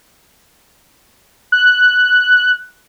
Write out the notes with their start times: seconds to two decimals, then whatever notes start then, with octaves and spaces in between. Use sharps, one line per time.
1.52 F#6